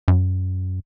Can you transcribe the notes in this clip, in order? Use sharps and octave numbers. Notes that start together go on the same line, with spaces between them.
F#2